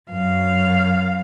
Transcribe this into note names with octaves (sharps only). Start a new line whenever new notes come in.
F#2 F5